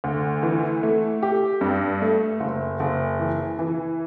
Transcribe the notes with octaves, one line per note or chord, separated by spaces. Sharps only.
D2
E3
A3
G4
G2
A3
F#1
F#1
E3
E3